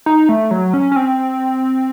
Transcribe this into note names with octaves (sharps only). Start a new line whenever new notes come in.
D#4
A3
F#3
C#4
C#4
C4